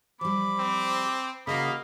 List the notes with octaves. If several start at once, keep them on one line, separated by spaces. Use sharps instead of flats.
F3 G3 B5 D6
C4
C#3 A#3 F#4 D#5 F5 B5